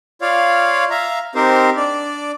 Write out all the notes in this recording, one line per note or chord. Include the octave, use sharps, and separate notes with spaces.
F4 C#5 D5 F5
E5 F5 A#5
C4 D#4 G4 A#4 C5
D4 D5